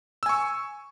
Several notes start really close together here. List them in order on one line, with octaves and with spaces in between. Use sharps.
E6 G#5 C#6